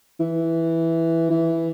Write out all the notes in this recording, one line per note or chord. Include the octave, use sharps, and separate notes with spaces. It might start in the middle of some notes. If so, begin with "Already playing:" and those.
E3
E3